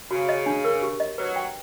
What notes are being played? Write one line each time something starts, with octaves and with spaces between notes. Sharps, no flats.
C#3 F#4
D#5
D4
A#4
G4
D#5
F#3 B4
G5